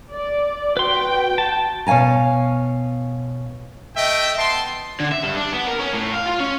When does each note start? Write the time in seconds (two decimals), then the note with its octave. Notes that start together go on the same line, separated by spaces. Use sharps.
0.12 D5
0.77 F#4 B4 G5 C6
1.38 A5
1.87 B2 C#5 F5 G#5 A#5
3.95 A3 D#5 E5 G5
4.37 B3 A5 C6
5.00 D3
5.12 E5
5.23 G2
5.37 D4
5.54 B3
5.68 A#4
5.81 C#4
5.94 A2
6.14 F5
6.27 F4
6.40 C#4